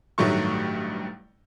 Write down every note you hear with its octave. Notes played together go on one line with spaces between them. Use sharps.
A1 G2 D#3 F#3 A3 C#6